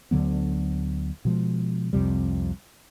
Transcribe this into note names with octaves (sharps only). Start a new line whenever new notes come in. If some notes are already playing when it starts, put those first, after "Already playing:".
D2 D3 F#3 B3
B2 F3 G#3
C2 F2 C3 G3